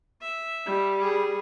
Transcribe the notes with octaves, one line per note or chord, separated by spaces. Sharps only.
E5
G3
G#4